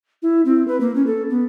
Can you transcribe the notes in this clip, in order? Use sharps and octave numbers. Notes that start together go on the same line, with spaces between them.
E4
C4
B4
A#3
C#4
A4
B3